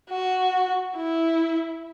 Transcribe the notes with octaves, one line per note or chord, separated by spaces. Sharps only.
F#4
E4